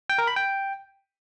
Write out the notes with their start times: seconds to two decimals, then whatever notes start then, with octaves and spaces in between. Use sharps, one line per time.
0.10 G5
0.18 A#4
0.27 B5
0.36 G5